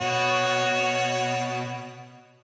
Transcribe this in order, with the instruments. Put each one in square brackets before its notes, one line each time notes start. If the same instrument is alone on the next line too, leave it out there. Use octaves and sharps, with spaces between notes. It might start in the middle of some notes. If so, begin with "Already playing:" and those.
[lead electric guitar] B2 [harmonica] F#4 C#5